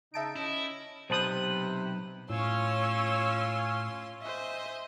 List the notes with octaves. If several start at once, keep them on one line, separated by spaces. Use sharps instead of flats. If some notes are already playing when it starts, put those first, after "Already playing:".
C#3 D#4 E5 A5 D7
C#4 E4 D#5
B1 C3 B4 C5 A5 D#6
A2 C#4 F4 C#5 C6 E6
C5 D#5 E5 G#5